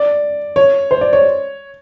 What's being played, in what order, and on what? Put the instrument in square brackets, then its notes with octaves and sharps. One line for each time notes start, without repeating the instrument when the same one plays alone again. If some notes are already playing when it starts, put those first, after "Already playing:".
Already playing: [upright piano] D5
C#5
C5
D5
C#5